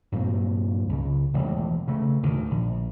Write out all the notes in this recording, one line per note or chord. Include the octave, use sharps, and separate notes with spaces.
G2 A#2 F#3 C4
C#2 C#3
E1 A1 D#2 G#3
C#3 A3
D2 A2 D#3
A#1